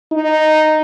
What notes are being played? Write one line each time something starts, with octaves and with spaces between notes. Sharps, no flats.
D#4